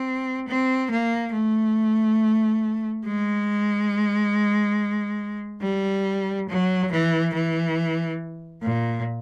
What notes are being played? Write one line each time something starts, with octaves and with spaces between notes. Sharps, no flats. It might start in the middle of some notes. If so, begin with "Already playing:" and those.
Already playing: C4
C4
A#3
A3
G#3
G3
F#3
E3
E3
A#2